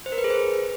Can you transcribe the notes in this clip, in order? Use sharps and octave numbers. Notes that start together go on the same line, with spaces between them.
C5
A#4
B4
G#4
C5